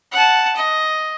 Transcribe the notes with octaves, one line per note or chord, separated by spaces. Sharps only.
F#5 A5
D#5